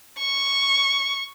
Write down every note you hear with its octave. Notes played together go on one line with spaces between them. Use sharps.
C#6